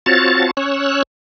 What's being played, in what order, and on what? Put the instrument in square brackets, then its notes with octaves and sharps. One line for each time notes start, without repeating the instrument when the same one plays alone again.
[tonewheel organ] C4 F4 F#4 C#5 A5 A6
C#4 C#5 E6 F#6